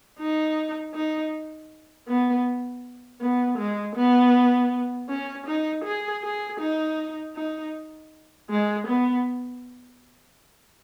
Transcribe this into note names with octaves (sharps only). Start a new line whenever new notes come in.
D#4
D#4
B3
B3
G#3
B3
C#4
D#4
G#4
G#4
D#4
D#4
G#3
B3